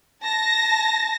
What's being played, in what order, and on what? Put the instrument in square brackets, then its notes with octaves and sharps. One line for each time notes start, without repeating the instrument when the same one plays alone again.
[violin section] A5 A#6